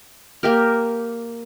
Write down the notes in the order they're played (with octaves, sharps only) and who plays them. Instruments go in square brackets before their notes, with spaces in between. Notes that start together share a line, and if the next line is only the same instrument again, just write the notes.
[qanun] A#3 G4 A#4